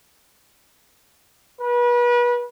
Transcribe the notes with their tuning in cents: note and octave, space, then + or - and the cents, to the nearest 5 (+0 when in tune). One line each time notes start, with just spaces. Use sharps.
B4 -35